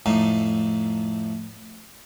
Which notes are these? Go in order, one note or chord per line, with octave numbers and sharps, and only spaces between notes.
F2 A2 D#4